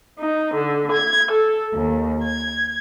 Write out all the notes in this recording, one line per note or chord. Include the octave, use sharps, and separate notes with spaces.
D#4
D3
G#6
A4
D#2
G#6